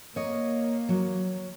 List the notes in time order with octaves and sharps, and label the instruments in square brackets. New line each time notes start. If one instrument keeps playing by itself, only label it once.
[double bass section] A#3 [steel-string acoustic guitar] C#5 D#5
[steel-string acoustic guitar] F#3